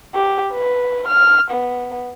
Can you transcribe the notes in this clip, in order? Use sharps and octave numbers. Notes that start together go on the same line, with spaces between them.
G4
B4
F6
B3